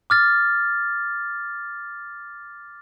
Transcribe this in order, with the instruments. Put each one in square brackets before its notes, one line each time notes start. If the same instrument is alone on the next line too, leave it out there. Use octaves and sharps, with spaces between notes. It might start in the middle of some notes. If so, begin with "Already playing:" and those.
[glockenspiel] D6 F6 A6